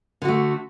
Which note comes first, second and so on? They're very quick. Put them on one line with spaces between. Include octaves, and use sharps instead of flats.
D3 F#4 A3